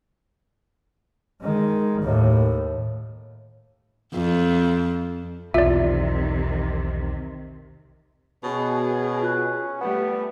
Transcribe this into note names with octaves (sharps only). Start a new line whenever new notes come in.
D#3 G#3
D#2 A2
F2
B1 E2 C3 D#3 E3 F4 D5 E5
B2 C#4 G#4
F4 F#6
G3 A3 B3 F#5